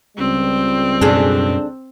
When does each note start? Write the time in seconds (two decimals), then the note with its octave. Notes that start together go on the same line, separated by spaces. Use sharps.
0.18 C#2 G3 C4
1.01 F#2 B2 D4 G#4 A4